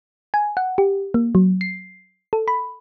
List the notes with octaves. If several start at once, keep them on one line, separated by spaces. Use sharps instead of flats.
G#5
F#5
G4
A#3
F#3
C7
A4
B5